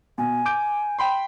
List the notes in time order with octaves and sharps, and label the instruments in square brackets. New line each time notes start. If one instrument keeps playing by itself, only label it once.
[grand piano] B2 [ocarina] G#5
[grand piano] D6 G6 D7
G5 B5 C6